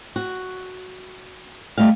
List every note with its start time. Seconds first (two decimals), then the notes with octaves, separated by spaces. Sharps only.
0.16 F#4
1.78 G3 A3 D#5 F5